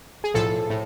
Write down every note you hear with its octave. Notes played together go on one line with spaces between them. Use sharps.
G#4
B1 A2 F3 A4
A2